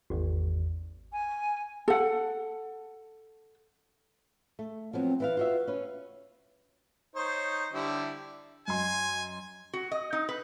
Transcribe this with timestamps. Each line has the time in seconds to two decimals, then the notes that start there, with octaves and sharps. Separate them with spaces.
0.10 G#1 E2
1.12 G#5
1.88 A4 F#5
4.59 A3
4.93 F3 F#3 B3 C4
5.20 E3 E4 B4 F5
5.37 F4 F#4 E5
5.67 C#4 B4
7.16 D#4 C5 C#5
7.73 D3 G3 E4
8.68 F#2 D#5 G#5 C6
9.73 F#4
9.92 D#5
10.13 D#4
10.29 B4